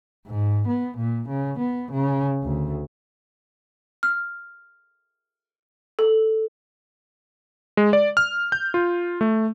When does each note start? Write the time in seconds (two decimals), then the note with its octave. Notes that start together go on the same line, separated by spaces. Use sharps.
0.27 G#2
0.68 B3
0.98 A#2
1.29 C#3
1.59 B3
1.92 C#3
2.44 D2
4.03 F6
5.99 A4
7.77 G#3
7.93 D5
8.17 F6
8.52 G6
8.74 F4
9.21 A3